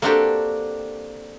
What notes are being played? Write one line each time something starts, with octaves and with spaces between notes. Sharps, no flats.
A#3 C4 D4 F#4 G4 A4